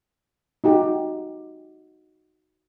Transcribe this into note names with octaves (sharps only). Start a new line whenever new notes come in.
D#4 F#4 G4